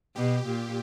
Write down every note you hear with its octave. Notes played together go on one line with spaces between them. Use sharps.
B2 G4
A#2